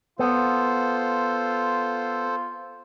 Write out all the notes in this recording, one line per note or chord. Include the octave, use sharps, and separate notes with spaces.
B3 F4 A4 C5